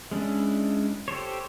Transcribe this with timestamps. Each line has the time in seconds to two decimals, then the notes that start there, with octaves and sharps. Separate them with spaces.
0.11 G#3 C#4 D4 E4
1.08 G4 A4 C5 C#5